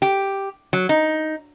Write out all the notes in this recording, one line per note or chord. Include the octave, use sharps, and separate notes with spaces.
G4
F#3
D#4